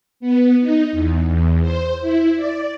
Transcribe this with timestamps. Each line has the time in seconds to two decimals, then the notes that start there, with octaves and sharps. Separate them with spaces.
0.20 B3
0.61 D#4
0.92 E2
1.27 E2
1.61 C5
2.01 E4
2.36 D5